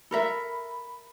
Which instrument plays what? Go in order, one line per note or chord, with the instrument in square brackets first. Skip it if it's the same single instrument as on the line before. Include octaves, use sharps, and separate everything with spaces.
[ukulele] A4 A#4 E5 [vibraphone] B5